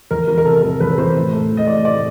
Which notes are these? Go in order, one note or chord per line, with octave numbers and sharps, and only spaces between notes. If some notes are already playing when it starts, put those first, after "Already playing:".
E2 A#4
E3 A#4
A#4
C3 A4
E2 A#4
E2 B4
B4
E3 C5
A2
A3
E3
D#5
A2 D5
A2 D5